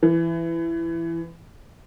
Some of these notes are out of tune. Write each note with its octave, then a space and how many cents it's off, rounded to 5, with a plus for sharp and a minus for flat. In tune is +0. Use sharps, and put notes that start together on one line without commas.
E3 +20